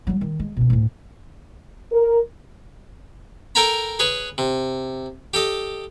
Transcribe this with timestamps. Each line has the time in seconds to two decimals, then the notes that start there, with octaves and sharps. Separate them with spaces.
0.07 F#3 G3
0.21 D#3
0.39 G#3
0.57 B2 C#4
0.70 D2 A2
1.92 A#4
3.55 A4 A#4 G5 G#5 A#5 B5
3.99 G#4 B4 C#5
4.38 C3
5.34 G4 A4 D#5